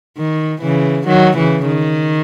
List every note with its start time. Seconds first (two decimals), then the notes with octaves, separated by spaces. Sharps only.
0.18 D#3
0.62 C#3 E3
1.07 D#3 F#3
1.37 C#3 E3
1.67 D#3